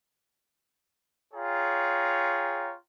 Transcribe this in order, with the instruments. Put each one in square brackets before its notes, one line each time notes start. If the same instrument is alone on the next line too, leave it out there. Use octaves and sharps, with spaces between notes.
[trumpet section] F4 G#4 C#5 G5 A#5